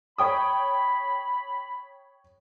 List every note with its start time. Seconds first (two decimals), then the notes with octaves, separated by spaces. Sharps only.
0.18 C#5 G5 B5 D#6